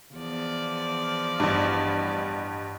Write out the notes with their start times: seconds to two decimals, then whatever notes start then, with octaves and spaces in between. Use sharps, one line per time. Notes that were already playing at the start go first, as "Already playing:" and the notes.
0.14 E2 F3 D5
1.40 A1 G2